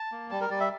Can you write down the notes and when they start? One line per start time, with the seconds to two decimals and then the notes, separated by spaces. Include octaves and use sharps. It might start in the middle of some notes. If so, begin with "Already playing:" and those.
Already playing: A5
0.12 A#3
0.31 G3 A5
0.41 A#4
0.50 G3 D5
0.60 E5